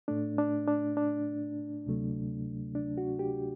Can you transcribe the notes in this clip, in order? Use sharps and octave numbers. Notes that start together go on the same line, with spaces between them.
A2 A3 D4
D4
D4
D4
D2 C3 F#3 A3
D4
F#4
G4